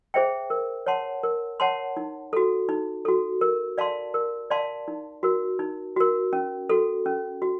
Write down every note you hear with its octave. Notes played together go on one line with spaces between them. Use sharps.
G#4 C5 E5 G5
A#4
C#5 F#5 A5 C6
A#4
C#5 F#5 A5 C6
D#4
F#4 A4
D#4
F#4 A4
A#4
D5 F5 A5 C6
A#4
D5 F5 A5 C6
D#4
F#4 A#4
D#4
F#4 A#4
C#4
F#4 A4
C#4
F#4